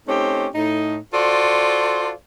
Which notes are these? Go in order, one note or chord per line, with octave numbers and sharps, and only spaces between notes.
A3 C4 C#4 D#4 G4
A2 D#4
F4 F#4 A4 C5 D5